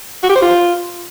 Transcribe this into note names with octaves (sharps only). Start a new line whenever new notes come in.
F#4
G4
C5
F4